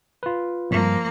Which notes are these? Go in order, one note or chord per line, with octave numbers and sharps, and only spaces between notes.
F4 B4
B1 G2 F3 A#3